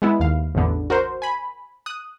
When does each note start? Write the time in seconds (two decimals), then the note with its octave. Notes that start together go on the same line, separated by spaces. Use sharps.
0.02 G#3 B3 E4
0.20 D#2 F5
0.55 A1 E2 D3 B3
0.90 F#4 A#4 C5
1.22 G#5 B5
1.86 D#6 F#6